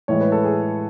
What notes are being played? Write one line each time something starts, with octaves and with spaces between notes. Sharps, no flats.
A2 E3 G#3 C#5
B4
A4
G#4